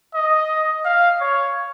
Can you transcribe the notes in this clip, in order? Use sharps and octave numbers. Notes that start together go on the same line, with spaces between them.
D#5
F5
C#5